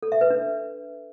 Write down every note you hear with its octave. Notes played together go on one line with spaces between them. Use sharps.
A4
E5
B4
D4